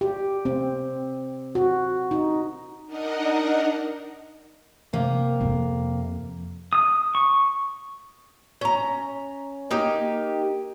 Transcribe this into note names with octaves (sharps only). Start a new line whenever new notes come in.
G4
C4
F#4
D#4
D4 D#4 A#4 D#5 F#5
C3 A#3
F2
D#6
C#6
C#4 A#5
A#3 D#4 G4